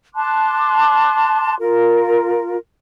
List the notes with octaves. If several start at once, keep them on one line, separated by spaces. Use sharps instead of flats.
A5 C6 D6 F#6
F4 A#4